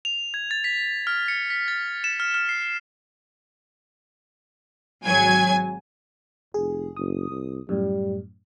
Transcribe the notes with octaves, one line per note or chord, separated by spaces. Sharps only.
F7
G#6
A6
B6
F6
C#7
B6
A6
E7
F6
F6
C7
G#1 F#3 G#5 G#6
F1 G#4
F#1 D#6
C2
F#2 A2 G3